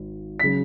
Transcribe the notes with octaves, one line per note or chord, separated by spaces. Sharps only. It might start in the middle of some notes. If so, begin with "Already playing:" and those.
Already playing: G#1
C#3 F#3 B6